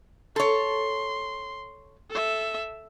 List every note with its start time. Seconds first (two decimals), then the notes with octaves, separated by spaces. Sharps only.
0.36 A4 C#5 C6
2.11 A4 E5